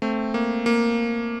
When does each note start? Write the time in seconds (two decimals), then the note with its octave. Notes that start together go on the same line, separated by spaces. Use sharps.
0.02 A3 C4
0.34 A#3
0.66 A#3